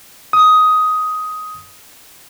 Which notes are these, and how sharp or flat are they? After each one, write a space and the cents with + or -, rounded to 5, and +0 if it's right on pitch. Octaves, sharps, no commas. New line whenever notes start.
D#6 +10